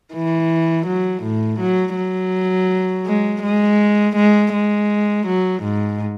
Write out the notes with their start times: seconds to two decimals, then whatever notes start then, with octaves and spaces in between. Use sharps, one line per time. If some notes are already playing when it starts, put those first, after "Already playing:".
0.13 E3
0.87 F#3
1.23 A2
1.60 F#3
1.96 F#3
3.06 G#3
3.43 G#3
4.16 G#3
4.53 G#3
5.27 F#3
5.64 G#2